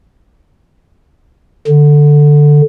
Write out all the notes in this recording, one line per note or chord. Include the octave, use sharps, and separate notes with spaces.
D3